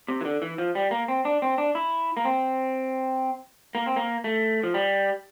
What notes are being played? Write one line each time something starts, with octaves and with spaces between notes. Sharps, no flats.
C3
E3
D3
E3
F3
G3
A#3
C4
D4
C4
D4
E4
A#3
C4
A#3
C4
A#3
A3
F3
G3